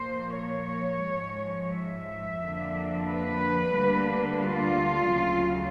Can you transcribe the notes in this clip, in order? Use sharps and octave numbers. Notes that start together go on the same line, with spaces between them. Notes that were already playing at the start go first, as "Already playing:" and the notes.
Already playing: A#2 F3 A#3 C5
C#5
G#2 F3 G#3
E5
F2 D3 F3 A#3 D4
B4
D2 D3 G3 A#3 D4
F4
D2 C#3 F#3